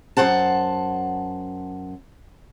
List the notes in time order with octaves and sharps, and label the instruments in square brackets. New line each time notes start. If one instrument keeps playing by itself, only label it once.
[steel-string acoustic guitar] F#2 D#3 C5 F#5 A5